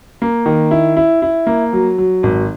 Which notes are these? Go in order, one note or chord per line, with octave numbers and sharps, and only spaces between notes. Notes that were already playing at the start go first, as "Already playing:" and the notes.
A#3
D#3
E4
E4
E4
A#3
F#3
F#3
G#1